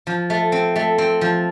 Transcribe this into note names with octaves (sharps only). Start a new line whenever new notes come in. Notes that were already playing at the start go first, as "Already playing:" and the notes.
F3
A3
C4
A3
C4
F3